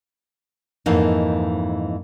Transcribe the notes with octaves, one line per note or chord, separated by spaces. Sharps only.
F2 G#2 E3 A#3 D#4